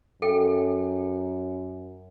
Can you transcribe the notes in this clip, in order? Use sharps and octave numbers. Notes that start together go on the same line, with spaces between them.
F#2 A4 G5